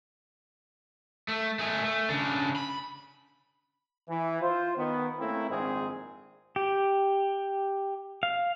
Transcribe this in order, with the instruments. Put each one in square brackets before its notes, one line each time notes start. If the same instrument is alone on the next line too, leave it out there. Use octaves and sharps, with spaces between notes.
[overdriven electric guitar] A3
A3 G#4
A3
C#3 D4
B5
[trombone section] E3
F4 C5
D#3 B3
A3 A#3 C4 C#4 E4
A#1 G#2 D#3 G#3 C4 G#4
[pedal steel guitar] G4
F5